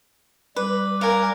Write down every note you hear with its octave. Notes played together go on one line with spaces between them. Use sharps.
G3 B4 D6
A#4 F5 G#5